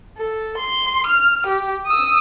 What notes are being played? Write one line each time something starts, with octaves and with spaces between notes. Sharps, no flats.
A4
C6
F6
G4
D#6 E6